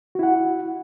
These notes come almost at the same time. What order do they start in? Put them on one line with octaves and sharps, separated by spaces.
F#4 E4 F#5